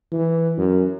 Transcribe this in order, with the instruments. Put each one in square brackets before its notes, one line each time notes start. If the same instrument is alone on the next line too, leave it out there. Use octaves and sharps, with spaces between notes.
[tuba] E3
F#2